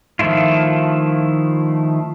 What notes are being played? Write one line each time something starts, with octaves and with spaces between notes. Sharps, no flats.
D#3 F3 A3 E4 F4